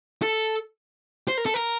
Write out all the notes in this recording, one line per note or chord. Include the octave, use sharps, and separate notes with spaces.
A4
C5
A#4
A4
A#4